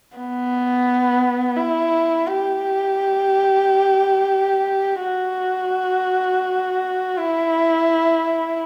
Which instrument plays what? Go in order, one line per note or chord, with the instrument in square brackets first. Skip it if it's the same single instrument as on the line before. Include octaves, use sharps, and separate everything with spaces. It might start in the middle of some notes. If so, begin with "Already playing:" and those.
[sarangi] B3
E4
G4
F#4
E4